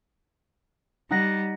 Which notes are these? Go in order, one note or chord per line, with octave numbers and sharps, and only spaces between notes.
G3 D#4 F#5 A#6